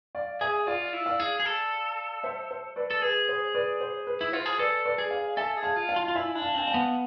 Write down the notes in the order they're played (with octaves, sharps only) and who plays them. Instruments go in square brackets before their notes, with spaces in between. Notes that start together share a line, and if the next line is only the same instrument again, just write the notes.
[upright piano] D5 F5
[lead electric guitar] G#4 [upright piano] E5 G#5
[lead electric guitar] F4 [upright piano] D5 F5
[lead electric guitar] E4
[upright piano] D5 F5
[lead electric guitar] G#4
G#4
A4
[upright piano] C5 E5
C5
B4 D5
[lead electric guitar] A4
[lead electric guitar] G#4 [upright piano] B4
[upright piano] C5
B4 D5
C5
B4
[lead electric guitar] E4
[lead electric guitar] F4 [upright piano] C5
[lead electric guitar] G#4
[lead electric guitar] A4 [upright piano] B4 D5
[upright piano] B4 D5
[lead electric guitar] G#4
[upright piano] D5 F5
[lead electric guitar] A4 [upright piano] E5 G#5
[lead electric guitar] G#4
[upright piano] F5 A5
[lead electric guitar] F4
[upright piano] F5 A5
[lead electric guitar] F4
F4
[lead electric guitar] E4 [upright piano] E5 G#5
[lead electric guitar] D4
[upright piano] F5 A5
[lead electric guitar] C4 [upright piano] G#5
[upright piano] F5 A5
[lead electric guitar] B3